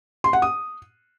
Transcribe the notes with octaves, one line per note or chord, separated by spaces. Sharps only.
C6
F#5
D#6